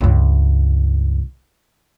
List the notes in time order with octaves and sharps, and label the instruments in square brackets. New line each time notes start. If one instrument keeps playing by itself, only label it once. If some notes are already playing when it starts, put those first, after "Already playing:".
[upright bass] C#2 G2